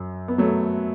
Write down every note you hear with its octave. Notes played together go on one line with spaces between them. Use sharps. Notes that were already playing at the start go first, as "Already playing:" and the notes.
Already playing: F#2
B3
F#3 A3